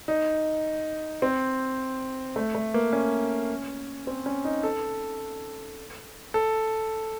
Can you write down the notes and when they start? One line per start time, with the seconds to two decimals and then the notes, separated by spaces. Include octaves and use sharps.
0.08 D#4
1.22 C4
2.36 A3
2.55 A3
2.74 A#3
2.93 C#4
4.07 C4
4.26 C#4
4.45 D#4
4.63 A4
6.34 A4